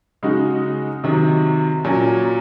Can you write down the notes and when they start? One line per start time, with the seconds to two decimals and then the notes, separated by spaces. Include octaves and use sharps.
0.23 C#3 G#3 D#4 F#4
1.04 C3 D#3 F#3
1.85 A#2 F#3 C#4